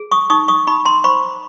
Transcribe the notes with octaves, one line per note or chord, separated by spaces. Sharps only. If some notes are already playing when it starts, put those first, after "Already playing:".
Already playing: G#4
C#6 D#6
D#4 C#6 D#6
C#6 D#6
D#4 B5 C#6
A#5 C6
C5 B5 C#6